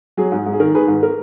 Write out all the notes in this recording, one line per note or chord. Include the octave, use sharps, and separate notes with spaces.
F#3 G#4
G#2
G#2
G#4
D#3 A#4
D#3 G#4 B4
G#2
A#4